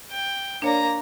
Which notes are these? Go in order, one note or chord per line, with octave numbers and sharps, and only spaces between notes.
G5
A#3 D4 C#5 D5 A#5